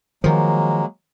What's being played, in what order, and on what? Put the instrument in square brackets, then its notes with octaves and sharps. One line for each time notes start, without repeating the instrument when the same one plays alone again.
[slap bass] D#3 F3 [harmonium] F#3 G#3 A#3